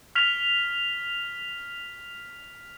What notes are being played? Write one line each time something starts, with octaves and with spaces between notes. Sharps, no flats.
F6 B6 F7